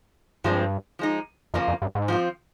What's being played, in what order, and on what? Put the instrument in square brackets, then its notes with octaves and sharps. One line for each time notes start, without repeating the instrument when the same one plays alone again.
[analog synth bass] G2 [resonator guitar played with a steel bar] F3 G#3 C4
[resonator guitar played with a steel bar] F3 G#3 D#4
[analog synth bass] F2 [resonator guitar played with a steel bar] C#3 F3 A#3 F4
[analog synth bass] F2
G2
G#2
[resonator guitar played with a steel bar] F3 C4 F4